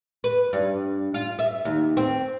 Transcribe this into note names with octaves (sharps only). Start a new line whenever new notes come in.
B4
G2
F4
E5
D#2
C4